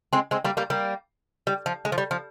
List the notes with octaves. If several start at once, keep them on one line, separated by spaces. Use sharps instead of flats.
G#3 C4
G#3 C4
G3 A#3
G3 A#3
G3 A#3
G3
F3
G#3
F3
G3
F3